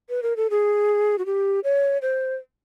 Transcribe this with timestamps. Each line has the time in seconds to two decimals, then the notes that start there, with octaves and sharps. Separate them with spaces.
0.09 B4
0.23 A#4
0.37 A4
0.50 G#4
1.18 F#4
1.26 G4
1.64 C#5
2.02 C5